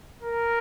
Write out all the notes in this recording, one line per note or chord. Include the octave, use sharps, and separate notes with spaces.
A#4